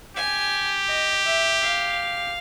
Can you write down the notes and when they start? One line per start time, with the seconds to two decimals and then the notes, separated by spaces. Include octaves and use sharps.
0.16 G4 G#5
0.88 D#5
1.24 E5
1.61 F5